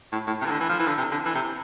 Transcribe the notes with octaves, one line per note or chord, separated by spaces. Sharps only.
A2
A2
C3
E3
D3
E3
F3
E3
D3
C3
D3
E3
C3